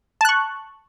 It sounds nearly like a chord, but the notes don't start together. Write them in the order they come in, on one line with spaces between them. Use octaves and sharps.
A5 F#6 C#6